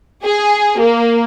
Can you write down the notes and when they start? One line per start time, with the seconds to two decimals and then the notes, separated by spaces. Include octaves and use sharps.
0.23 G#4
0.80 A#3